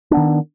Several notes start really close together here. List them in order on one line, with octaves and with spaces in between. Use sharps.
D4 B3 D#3